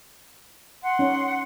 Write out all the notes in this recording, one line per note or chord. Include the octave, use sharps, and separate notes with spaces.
F#5 C6
C#4 D#4